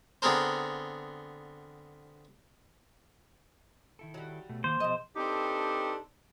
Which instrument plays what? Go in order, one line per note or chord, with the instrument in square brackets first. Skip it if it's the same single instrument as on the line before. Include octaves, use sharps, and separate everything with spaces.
[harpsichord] D3 B3 C4 G#4 A#4 C5
[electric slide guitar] D#3 E4 A4
[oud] F#3 G3
[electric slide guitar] B2 A3
[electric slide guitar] D#3 A#3 [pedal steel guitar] C5
[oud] B2 D#5 [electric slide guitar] F3 G#4
[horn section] C4 D4 D#4 G4 A4 B4